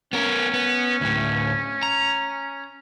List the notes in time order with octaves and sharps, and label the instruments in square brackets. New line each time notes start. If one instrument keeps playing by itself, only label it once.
[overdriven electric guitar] B3 A#4 [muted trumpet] C#4
[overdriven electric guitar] B3
D2 A2
A#5